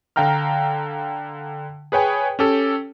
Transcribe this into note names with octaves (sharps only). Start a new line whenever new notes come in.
D3 F5 G5 A#5 F6
G#4 B4 C#5 G5 G#5
C#4 G4 A4